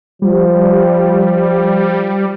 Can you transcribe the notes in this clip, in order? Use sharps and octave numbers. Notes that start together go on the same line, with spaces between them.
F3 G3